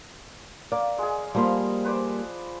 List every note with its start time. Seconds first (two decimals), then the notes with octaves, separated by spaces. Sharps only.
0.72 A#3 D5
0.98 G#3 G#4
1.35 F3 G3 A#3 B5 C6
1.84 B4 C5 D5